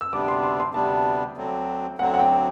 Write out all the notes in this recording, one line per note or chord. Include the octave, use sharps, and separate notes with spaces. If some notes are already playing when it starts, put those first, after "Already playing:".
E6
D2 C3 G3 B3 D4 D6
C6
C6
C6
D2 C3 G3 B3 D4 A5
D2 D3 F#3 C4
D2 D3 F#3 C4 F#5
F#5
G5